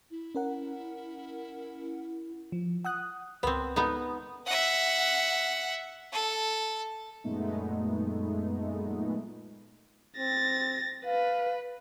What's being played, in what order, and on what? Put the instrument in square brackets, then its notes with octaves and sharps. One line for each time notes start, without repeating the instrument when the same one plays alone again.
[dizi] E4
[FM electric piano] C#4 A#4 F#5
F3
[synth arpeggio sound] F#5 D#6 F#6
[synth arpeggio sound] C#2 A#4 B4 [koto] B3 C4
[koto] B3 D#4 [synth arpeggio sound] A4
[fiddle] E5 F#5
A4
[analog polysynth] F#2 A#2 G#3 A3 B3 D#4
[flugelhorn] C4 [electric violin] A6 A#6
[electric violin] B4 [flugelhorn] F5